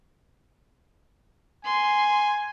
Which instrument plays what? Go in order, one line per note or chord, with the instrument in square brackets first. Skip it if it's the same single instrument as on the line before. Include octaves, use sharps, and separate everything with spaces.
[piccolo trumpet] G#5 [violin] C6